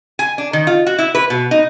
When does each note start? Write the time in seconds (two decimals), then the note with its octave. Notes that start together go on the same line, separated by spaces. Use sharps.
0.19 G#5
0.38 D4
0.53 D#3
0.67 F4
0.87 F#4
0.98 E4
1.15 B4
1.30 B2
1.51 D#4